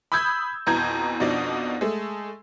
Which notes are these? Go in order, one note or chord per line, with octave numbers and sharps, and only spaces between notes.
B5 D#6 E6 G6 G#6
F2 B2 E3 A#5 G6 G#6
F2 B2 F3 D4 D#4
G#3 A3